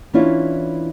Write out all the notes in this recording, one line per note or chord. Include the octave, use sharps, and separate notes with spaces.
E3 C#4 D4 E4 F4 C#5